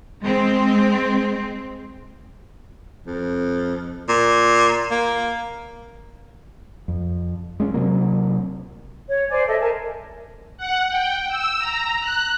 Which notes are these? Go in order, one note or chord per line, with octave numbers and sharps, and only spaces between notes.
G#3 C4
F2
A#2
A#3
F2
G#3 C#4
C3 F#3 A#3
C#5
C5 D5 G#5
A4 D#5 E5
A#4 G#5 A5
F#5
G5
E6
A#5
F#6